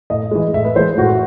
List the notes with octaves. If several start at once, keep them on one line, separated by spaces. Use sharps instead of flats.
A2 D#5
E3 G#3
A2 E5
B4
E3 G#3 C5
A2 F#4